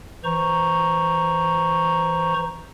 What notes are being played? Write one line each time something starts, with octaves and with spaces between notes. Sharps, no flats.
E3 C5 A#5 C#6